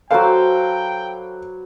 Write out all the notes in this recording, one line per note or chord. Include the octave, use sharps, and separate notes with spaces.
F#3 F#4 A4 B4 C5 F5 G5 D6